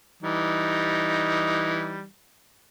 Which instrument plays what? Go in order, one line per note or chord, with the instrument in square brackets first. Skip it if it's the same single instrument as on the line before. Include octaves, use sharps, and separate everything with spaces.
[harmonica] E3 G3 D#4